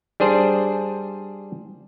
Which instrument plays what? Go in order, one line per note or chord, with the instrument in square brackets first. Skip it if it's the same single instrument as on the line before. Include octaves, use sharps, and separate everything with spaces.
[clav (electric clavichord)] G3 D4 G#4 C5